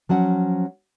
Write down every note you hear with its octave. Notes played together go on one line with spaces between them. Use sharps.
F3 F#3 C#4 F#5